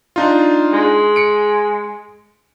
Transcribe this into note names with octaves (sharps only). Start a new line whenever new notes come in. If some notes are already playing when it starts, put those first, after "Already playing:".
D4 D#4 F4
G#3
C#7 D7